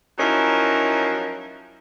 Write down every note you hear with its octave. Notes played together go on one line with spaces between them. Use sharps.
F3 F#3 C#4 D#4 E4 A#4